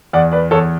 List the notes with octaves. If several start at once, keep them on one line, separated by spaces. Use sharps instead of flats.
E2 D5 F#5
B4 D5
E2 A4 C#5